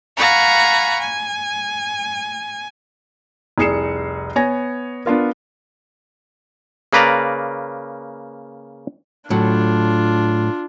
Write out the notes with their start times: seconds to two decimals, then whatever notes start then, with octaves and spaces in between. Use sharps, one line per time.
0.17 F5 F#5 G#5 A#5 B5 C#6
0.99 G#5
3.58 F1 C2 G#4 C7 C#7 E7
4.36 B3 C#5 G#5 A#6
5.06 B3 D4 F4 A#4
6.93 C#3 A#3 B4 D5 A#5
9.30 A2 F#3 D4 F4